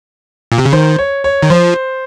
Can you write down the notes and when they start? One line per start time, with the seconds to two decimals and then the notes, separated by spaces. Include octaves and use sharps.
0.52 A#2
0.58 C3
0.66 C#3
0.73 D#3 C5
0.99 C#5
1.24 C#5
1.43 D#3
1.50 F3 C5